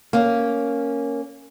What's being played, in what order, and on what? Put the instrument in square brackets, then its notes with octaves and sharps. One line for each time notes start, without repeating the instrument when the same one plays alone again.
[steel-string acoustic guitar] A#3 C#4